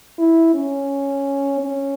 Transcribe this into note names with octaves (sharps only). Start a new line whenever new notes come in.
E4
C#4
C#4